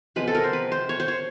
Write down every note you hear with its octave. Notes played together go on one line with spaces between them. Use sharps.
C3 F3 G#3 B3 B4
A4
A#4
C5
B4
C5
C#5
C5
C#5